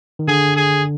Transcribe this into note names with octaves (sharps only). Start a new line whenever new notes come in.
D#3
D3 G#4
G#4